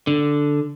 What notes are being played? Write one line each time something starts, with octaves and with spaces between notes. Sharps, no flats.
D3